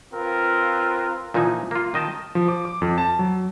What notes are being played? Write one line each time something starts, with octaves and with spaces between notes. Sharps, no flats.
C4 F4 A#4 B4
A#2 E3 F3 D#4 G#5
A#3 F4
D#3 D#5 G5 A5
F3
D6
D6
F2
A5
F#3